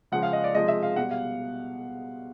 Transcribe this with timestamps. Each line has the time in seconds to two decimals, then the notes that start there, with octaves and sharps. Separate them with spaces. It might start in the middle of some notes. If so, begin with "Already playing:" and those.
0.12 C#3 F3 G#3 F#5
0.23 F5
0.33 D#5
0.44 D5
0.54 C3 F3 G#3 D#5
0.68 E5
0.83 F5
0.96 B2 G3 F#5
1.11 F5